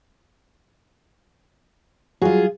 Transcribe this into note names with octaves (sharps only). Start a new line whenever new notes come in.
F#3 G3 F4 F#4 G#4